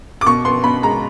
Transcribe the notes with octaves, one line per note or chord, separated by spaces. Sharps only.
D6
B2 C#6
B3 C6
B2 B5
G#3 A#5